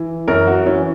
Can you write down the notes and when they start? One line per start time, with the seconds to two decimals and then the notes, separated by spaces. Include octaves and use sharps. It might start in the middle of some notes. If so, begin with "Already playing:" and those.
Already playing: E3
0.28 F#2 A#4
0.47 F#4
0.66 E3 C#4